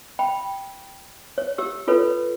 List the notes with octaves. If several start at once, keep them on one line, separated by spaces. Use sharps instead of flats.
G5 B5
C#5
G4 E6
F4 A4 B4 C#5